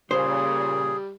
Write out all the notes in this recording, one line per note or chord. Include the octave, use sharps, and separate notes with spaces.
A#2 C#3 G3 G#4 C5